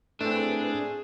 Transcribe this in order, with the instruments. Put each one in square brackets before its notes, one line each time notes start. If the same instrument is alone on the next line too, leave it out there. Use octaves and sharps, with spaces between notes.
[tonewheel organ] A2 B4 [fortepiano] A3 C4 [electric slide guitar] D4 [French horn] G#4